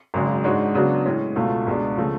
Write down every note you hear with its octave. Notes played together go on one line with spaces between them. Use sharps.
G#1 F#2 C#3 G#3
G#2 G#3 D4 F#4 C#5
C#3 F#3 B3 D4 F#4
A2 G#3 C#4
C#2 B2 A3 F4
C#2 B2 G#3 D4
C#3 F3 A3